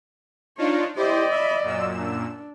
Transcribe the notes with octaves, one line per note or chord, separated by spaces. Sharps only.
D4 D#4 F4 C#5
E4 G4 C5 D5 D#5
E5 B5
F#2 A#2 E6
D4